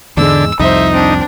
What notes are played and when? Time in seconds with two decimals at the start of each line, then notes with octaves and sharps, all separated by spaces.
0.17 E2 G#2 D3 G#3 E6
0.60 C2 F2 D#4 C5 E5
0.93 C4 D4